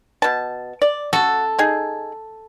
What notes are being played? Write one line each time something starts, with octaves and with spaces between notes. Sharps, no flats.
B2 A5
D5
F#4 A4
D#4 G#4